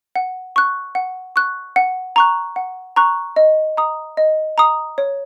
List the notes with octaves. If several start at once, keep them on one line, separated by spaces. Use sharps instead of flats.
F#5
C#6 F#6
F#5
C#6 F#6
F#5
A#5 C#6 F#6
F#5
A#5 C#6 F#6
D#5
A#5 D#6
D#5
A#5 D#6
C#5